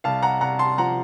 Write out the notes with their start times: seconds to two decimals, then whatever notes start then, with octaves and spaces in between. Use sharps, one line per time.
0.04 C2 F5 A5
0.22 F#5 A#5
0.41 C2 F#5 A#5
0.59 A5 C6
0.78 F3 F#5 A#5